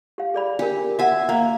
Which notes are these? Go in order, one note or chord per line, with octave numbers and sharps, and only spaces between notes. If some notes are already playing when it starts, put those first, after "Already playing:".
G4 F5
G#4 D5 B5
D4 G4 A#4
F#4 E5 F#5 G#5
A#3